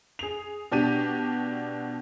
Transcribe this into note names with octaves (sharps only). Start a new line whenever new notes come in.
G#4 F7
B2 D4 G4 D#7